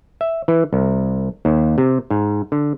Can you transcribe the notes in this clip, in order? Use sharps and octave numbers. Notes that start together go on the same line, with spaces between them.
E5
E3
C2
D#2
C3
G#2
D3